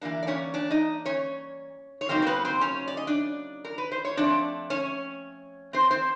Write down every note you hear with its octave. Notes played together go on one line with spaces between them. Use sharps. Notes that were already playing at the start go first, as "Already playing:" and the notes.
E3 G3 A#3 D4
D5
C#4 C#5
D4 D5
D#4 D#5
C#4 C#5
C#5
C#3 F#3 A#3 C4 D#4 C5
C5
B3 B4
C4 C5
C#4 C#5
D5
D#5
D4 D5
A#4
B4
C5
C#5
F3 A3 C4 D4 D5
C#4 C#5
C4 C5
C4 C5